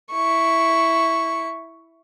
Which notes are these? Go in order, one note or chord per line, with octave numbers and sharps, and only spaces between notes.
E4 C#6